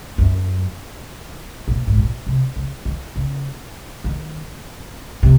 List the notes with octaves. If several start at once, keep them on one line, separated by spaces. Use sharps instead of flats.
F#2
A#2
G#2
A#2
C3
C#3
D#3
C#3
D#3
C3